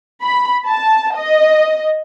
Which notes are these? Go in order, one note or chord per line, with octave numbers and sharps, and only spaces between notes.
B5
A5
D#5